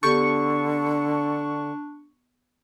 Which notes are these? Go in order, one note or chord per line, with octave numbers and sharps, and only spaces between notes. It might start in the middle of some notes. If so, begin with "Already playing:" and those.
D3 B3 D4 G4 A4 C#6